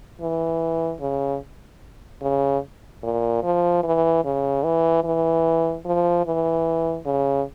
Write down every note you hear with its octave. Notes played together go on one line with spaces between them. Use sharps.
E3
C#3
C#3
A#2
F3
E3
C#3
E3
E3
F3
E3
C#3